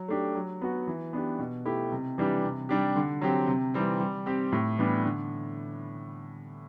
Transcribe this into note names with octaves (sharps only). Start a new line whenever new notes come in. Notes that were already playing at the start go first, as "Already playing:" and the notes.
Already playing: F#3
A3 D4 G4
F#3
B3 F#4
E3
B3 D4 G4
B2
A3 E4 G4
C3
E3 G3 D4 G4
C3
G3 D4 G4
D3
F#3 C4 G4
C3
E3 G3 C4
G3
C4 G4
A2
E3 G3 B3 D4
D3